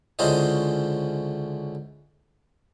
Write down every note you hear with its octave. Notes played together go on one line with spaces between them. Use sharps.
C#2 D3 C#4 E4 C5 D#5